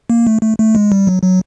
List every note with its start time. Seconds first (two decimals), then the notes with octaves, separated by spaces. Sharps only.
0.10 A#3
0.27 A3
0.42 A3
0.58 A3
0.75 G#3
0.92 G3
1.07 F#3
1.23 F#3